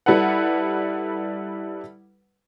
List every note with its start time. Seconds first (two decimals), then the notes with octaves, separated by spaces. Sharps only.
0.06 G3 E4 A4 B4 F#5